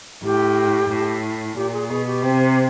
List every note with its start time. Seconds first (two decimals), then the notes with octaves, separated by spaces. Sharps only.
0.24 A2 G4
0.90 A2
1.56 A#2 G4
1.73 G#4
1.89 B2 G#4
2.06 G4
2.22 C3